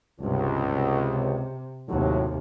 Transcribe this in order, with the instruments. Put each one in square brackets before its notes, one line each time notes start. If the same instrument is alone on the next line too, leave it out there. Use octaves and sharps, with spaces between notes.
[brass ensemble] C#2 [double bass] G2 C3
[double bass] C3
[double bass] D#2 C3 [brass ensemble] A2 F#3